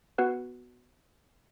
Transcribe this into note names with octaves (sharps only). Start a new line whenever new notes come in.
B3 F#4 B4 F#5